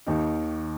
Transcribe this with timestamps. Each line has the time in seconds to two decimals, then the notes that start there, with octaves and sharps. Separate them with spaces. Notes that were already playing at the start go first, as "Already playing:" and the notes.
0.07 D#2 D#3 D#4